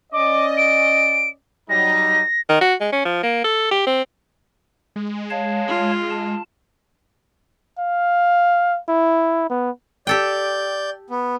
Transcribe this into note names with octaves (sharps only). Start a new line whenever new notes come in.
C#4 D5 D#5 D6
D7
F#3 G3 D#4 A#6
D#3
F#4
G#3
C#4
F3
A#3
A4
G4
C4
G#3
C#5 F5 A5
F4
A5
F5
E4
B3
G4 A4 D5 G5 G6
B3